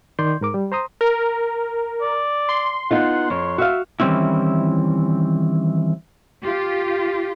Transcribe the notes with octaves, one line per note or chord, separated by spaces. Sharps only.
D#3 D5 C6 G6
G#2 A#4 D6
G3
C5 A#5 C6 D#6
A#4
D5
C6
B3 D#4 F4 F#5
F2 C#5
F#4 E5 F5
D#3 E3 G3 C4 C#4 E4
F4 G4